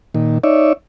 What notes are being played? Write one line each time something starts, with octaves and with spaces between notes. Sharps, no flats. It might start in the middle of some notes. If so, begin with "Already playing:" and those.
A#2 D#3
D#4 C#5 D5 E5